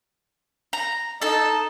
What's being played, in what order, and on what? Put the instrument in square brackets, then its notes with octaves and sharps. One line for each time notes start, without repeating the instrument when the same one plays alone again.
[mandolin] A#5
[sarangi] D#4 [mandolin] A4 A5